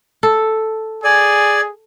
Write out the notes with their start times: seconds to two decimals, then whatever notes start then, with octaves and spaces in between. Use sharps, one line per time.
0.23 A4
1.04 G#4 D5 G#5